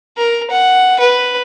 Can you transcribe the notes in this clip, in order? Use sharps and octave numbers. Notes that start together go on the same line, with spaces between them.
A#4
F#5
B4